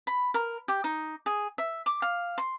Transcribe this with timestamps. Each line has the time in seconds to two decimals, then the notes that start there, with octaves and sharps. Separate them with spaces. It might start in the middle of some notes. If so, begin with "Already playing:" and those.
0.07 B5
0.34 A#4
0.68 G4
0.84 D#4
1.26 G#4
1.58 E5
1.86 D6
2.02 F5
2.38 C6